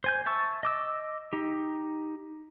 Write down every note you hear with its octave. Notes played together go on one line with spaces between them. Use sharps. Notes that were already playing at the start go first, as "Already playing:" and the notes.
C5 G#5 G6
E5 A5 C#6 E6
D#5 D6 E6
D#4 G4